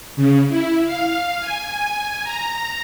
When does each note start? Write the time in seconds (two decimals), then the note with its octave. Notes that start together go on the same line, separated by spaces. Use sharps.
0.16 C#3
0.49 E4
0.85 F5
1.40 G#5
2.24 A#5